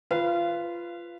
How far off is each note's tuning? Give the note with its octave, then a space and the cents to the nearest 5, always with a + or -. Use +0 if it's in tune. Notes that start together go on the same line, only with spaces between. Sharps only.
F4 -15 B4 +0 F5 -30